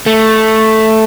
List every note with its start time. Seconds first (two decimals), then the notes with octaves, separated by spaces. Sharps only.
0.06 A3